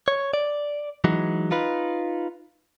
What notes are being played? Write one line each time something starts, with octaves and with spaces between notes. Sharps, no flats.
C#5
D5
E3 F#3 G#3 D#4
D#4 F4 B4